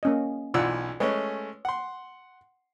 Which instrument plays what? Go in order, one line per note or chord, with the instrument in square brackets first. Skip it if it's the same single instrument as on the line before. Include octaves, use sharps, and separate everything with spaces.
[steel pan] A#3 C#4 D#5
[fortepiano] B1 E3 E6 [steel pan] F4 D5 F#5
[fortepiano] G#3 A3 C#4 [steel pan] B4 C#5
[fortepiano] F#5 C6